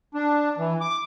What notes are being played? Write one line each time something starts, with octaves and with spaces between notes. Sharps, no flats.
D4
E3
D6